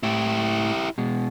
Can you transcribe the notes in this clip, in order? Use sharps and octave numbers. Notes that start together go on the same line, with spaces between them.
A2 E4 G4
B2 G#3